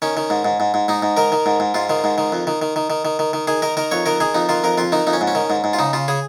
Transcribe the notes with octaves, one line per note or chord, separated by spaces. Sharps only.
D#3 C#4
D#3
G#2
G#2
G#2
G#2
G#2 D#4
G#2
D#3 A#4
D#3
G#2
G#2
G#2 F4
D#3
G#2
D#3
F2
D#3
D#3
D#3
D#3
D#3
D#3
D#3
D#3 G#4
D#3 A#4
D#3 A#4
F2 C#5
D#3 A#4
D#3 G#4
F2 D#4
D#3 F4
F2 A#4
F2 F4
D#3 D#4
F2 D#4
C#4
G#2
C#4
D#3
G#2
G#2
F4
C#3 D#4
C#3 F4
C#3 G#4